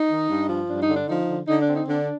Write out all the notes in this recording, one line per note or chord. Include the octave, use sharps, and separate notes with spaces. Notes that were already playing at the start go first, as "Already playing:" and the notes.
Already playing: D#4
D#3
G2
F3
G2 D4
D#4
D3
D4
F3 D#4
D3
D3 D#4
D4
C4
D#4
D3 D4